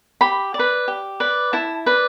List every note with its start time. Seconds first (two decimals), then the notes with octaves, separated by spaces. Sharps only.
0.21 G4 B5
0.54 D5
0.59 B4
0.88 G4
1.20 B4 D5
1.53 E4 A5
1.86 B4 D5